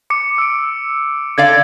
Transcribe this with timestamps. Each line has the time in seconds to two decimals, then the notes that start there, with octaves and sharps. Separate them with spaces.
0.10 D6 C#7
0.38 E6 D7
1.38 D3 D5 F5 G#6